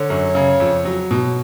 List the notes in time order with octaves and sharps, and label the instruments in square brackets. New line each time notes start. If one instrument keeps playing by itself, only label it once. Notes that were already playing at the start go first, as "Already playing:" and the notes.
Already playing: [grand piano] D3 [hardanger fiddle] C#5
[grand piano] F#2
C#3
F2
F#3
B2